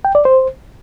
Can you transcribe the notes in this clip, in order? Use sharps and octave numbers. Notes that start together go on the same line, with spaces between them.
G5
D5
C5